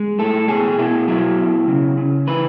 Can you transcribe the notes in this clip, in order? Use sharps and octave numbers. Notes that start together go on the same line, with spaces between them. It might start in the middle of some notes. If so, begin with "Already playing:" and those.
Already playing: G#3
A2 A4
B2 G#4
B2 E4
F#3 E4
B2
C#3
C#3
E3 B4